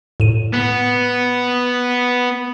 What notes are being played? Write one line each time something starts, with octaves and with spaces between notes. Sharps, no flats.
A2 D#7
B3